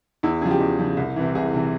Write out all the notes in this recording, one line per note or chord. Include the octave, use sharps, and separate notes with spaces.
E2 E4
C#3 F3 G#4
G4
E2
C#3 F3
C2
C3 E3
C2 G#4
C3 E3